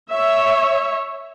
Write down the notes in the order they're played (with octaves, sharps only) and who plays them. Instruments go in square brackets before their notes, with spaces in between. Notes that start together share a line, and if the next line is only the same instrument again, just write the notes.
[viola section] C#5 E5